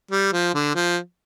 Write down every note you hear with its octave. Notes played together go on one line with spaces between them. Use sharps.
G3
F3
D3
F3